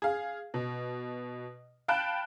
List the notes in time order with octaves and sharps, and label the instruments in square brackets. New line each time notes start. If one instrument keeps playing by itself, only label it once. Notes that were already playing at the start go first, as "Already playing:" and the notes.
[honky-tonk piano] G#4 F5
B2
F5 G5 A5 B5 F#6